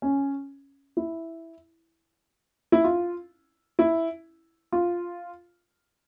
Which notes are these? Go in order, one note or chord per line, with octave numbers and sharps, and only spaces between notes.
C#4
E4
E4
F4
E4
F4